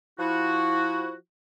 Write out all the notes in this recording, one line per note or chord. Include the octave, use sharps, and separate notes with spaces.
F3 E4 F#4